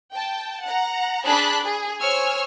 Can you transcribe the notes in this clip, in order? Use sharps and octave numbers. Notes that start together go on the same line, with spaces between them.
G5 A5
F#5 A#5
D4 G#4 A5 B5 F#6 B6
G#4
C5 C#5 G#5 C#6 E6 F6